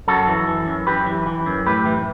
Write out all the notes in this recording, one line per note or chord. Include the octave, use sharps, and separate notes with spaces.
F#2 F#4 A4
E3
E3
F#2
F#2 G4 B4
E3
E3
F#2
A2 G4 B4
E3